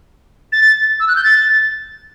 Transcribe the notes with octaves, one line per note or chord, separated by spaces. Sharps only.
A6
E6
F#6
G6
A6